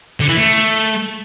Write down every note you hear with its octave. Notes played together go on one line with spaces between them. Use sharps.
D3
E3
A3